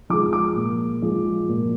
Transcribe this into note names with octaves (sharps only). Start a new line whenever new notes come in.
F3 G#3 D6
D6
A#2
F3 G#3
A#2